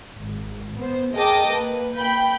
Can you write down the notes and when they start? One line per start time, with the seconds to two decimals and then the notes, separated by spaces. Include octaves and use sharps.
0.16 G#1
0.77 B3 C5
1.14 G#4 A#4 D#5 G5 A5 D6
1.47 A#3 B4
1.96 G5 B5 G6